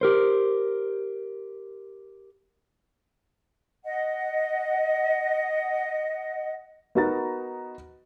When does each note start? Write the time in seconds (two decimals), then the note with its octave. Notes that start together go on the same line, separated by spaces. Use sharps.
0.01 G4 A#4 C5
3.84 D#5 F#5
6.95 B3 D#4 F#4 A#4 A#5 A6